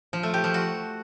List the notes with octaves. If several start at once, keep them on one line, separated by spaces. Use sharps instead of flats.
F3
A3
G4
F3
F#4